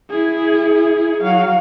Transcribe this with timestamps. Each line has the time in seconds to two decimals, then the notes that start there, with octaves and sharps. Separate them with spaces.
0.11 E4 G#4
1.23 F#3 F5